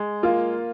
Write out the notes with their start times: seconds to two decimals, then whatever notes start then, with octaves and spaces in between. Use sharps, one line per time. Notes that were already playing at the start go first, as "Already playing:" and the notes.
Already playing: G#3
0.23 A#3 F4